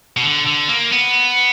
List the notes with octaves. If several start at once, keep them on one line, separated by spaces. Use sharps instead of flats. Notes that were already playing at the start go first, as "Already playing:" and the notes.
B2
D3
D3
A#3
B3